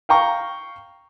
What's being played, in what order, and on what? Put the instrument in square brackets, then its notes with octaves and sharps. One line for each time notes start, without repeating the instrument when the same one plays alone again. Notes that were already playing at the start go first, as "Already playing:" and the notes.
[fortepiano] F5 G5 A#5 C#6